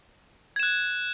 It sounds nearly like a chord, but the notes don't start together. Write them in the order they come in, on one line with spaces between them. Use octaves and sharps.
G#6 E7 F#6